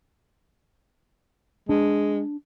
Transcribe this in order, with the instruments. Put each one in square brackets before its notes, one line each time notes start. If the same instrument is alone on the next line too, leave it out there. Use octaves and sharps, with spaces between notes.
[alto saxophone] G#3 [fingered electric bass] D4